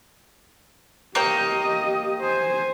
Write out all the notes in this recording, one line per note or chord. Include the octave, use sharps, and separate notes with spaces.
A#3 G4 C#5 D#5 G5
C5 G#5